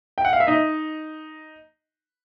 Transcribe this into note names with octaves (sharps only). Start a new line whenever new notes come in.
G5
F#5
F5
E5
D#4 D#5